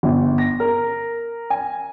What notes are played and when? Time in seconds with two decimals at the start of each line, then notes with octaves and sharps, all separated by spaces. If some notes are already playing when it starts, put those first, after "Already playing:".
0.03 G1
0.38 A#6
0.60 A#4
1.50 G#5